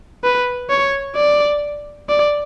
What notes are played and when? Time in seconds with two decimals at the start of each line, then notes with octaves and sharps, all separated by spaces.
0.24 B4
0.70 C#5
1.16 D5
2.09 D5